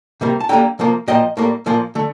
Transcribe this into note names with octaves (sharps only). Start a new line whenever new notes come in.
C3 G3 A#3
A5
D3 G3 A#3 G5 A#5
C3 F3 A#3
A#2 F3 A#3 D#5 G5
A2 G3 A#3
A#2 F3 A#3
D3 A3